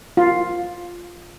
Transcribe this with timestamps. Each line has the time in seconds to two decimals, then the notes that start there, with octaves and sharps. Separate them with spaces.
0.17 F4